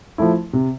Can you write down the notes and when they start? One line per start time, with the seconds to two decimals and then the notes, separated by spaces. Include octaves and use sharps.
0.18 F3 A3 E4
0.53 C3